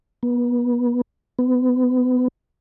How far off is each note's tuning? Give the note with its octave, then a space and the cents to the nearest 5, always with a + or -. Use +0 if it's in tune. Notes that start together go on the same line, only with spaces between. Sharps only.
B3 -30
B3 +30